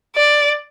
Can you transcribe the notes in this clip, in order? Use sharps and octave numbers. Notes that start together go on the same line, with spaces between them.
D5